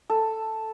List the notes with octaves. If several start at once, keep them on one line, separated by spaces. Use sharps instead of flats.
A4